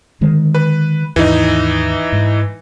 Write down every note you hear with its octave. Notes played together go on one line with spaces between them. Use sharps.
D3 D#3 G#3
B4
D#2 G#2 E3 D#4
G#2